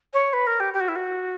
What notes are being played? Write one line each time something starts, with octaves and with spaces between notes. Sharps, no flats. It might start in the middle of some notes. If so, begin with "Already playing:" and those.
C#5
B4
A#4
G4
G4
F#4
E4
F#4